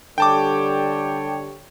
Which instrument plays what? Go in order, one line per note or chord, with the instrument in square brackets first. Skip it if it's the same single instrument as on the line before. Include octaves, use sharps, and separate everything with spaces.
[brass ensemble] D3 G3 C#5 [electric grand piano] G5 A5 D6